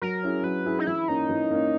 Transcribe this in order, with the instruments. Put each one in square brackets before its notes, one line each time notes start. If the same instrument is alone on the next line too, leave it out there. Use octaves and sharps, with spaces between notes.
[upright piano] F#3 [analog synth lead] A#4
[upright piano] C#4 E4 G#4
[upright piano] F#3 [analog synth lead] B4
[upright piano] C#4 E4 G#4
[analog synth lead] D#4
[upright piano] E3 [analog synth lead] E4
[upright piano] A#3 C#4 [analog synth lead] D#4
[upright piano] E3
A#3 C#4